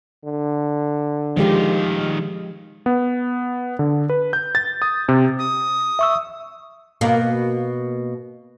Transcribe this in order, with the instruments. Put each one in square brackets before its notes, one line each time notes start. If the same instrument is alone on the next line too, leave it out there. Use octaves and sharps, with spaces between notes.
[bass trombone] D3
[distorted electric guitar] D#3 F4 [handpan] F3 G#3 G4
[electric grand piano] B3
D3
B4
G6
A6
D#6
C3
[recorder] D#6
[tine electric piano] E5 C#6 E6
[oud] B2 A#3